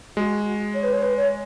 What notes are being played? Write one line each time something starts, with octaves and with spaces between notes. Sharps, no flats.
G#3 F#4
C#5
B4
C#5
B4
C#5